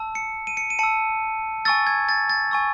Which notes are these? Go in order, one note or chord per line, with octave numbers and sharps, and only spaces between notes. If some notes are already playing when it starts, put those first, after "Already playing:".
Already playing: A5 E6
C#7
D#7
C#7
D#7
A5 E6 C#7
G#5 C#6 E6 A6
G#6
A6
A6
G#5 C#6 E6